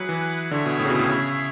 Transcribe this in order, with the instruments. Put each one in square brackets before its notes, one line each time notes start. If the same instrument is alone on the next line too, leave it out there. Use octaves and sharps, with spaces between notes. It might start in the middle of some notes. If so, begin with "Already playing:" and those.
Already playing: [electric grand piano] F#3 [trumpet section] E4 G#4 B4 F#5
[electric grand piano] E3
[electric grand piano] D3 [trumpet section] E4 G#4 C#5 E5
[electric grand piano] B2
A2
C#3
B2
A2
C#3